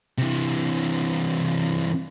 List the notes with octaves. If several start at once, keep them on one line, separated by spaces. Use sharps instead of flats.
C3 E3